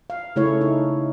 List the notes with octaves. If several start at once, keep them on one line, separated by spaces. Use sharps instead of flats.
F5
C#3 A3 E4 C#5
D#4